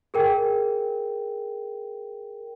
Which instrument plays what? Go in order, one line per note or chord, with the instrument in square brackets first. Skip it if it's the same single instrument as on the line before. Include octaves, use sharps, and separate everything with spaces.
[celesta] G#4 A#4 G5